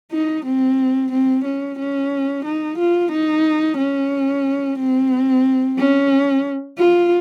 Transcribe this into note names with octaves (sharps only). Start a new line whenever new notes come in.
D#4
C4
C4
C#4
C#4
D#4
F4
D#4
C#4
C4
C#4
F4